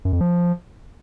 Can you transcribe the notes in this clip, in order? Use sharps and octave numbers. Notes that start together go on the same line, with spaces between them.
F#2
F2
F3